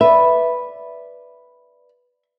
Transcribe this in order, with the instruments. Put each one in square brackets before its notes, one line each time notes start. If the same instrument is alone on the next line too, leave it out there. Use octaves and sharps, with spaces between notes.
[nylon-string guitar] B4 D5 [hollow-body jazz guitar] E5